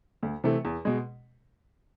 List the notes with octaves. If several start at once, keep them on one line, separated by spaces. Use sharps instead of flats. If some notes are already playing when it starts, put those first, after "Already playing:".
D2
C3 E3 A3
E2
B2 G#3